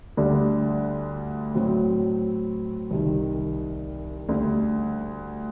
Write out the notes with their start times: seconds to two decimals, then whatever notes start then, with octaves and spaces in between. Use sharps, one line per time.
0.17 D2 D3 G3 D4
1.54 A2 F#3 C4
2.91 C2 C3 D#3
4.29 D2 D3 G3